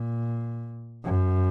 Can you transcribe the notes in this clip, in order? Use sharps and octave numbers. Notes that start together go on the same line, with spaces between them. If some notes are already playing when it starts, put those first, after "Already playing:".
Already playing: A#2
F#2